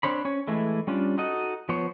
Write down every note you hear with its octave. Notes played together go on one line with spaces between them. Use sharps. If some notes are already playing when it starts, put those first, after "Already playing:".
C4 D4 C5 C#5 B5
C#4 C#5
E3 G#3 A3 E4
G3 C#4 D4 F4
D#4 F#4 A4 D#5
F3 B3 C5 C#5